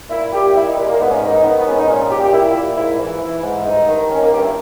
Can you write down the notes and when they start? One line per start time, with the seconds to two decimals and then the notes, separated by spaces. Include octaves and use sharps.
0.09 A#2 E4
0.31 A#2 G4
0.54 A#2 E4
0.65 D#4
0.75 A#2 G#3
0.87 A#3
0.98 G#2 B3
1.09 C#4
1.21 D#3 D#4
1.32 D#4
1.43 D#3 B3
1.57 B3
1.65 G#2 C#4
1.77 D#4
1.88 A#2 C#4
2.09 A#2 G4
2.20 G4
2.31 A#2 E4
2.54 A#2
2.76 G#2 E4
2.98 E3
3.20 E3
3.42 G#2
3.65 G2 D#4
3.87 D#3
4.09 D#3 C#4
4.21 A#3
4.31 G2 G4
4.42 E4